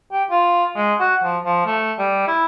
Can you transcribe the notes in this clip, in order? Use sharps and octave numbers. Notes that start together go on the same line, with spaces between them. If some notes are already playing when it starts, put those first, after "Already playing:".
G4
F4
G#3
F#4
F3
F3
A3
G3
E4